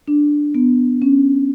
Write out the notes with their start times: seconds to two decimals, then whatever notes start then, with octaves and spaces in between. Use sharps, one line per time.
0.08 D4
0.55 B3
1.02 C#4